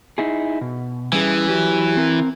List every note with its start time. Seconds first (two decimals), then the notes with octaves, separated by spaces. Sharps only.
0.18 D#4 E4 G#4
0.61 B2
1.13 E3 G3 C#4 G#4
1.48 F#3 G4
1.97 C4 A#4